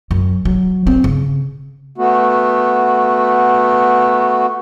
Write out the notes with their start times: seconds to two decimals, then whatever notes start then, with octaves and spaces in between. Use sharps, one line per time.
0.11 F#2
0.45 F#3
0.87 C4
1.04 C#3
1.98 A3 B3 F#4